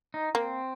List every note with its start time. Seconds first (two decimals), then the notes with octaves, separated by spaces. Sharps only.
0.14 D#4
0.35 A#3 C4